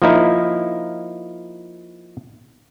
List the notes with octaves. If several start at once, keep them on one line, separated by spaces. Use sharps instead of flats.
F3 A#3 D#4 E4